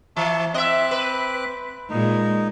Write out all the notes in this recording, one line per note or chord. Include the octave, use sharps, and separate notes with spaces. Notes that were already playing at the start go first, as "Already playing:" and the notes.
E3 E5 A5 C#6
C4 D#5 E5 D6 F#6
B4
A#2 G#3 D#4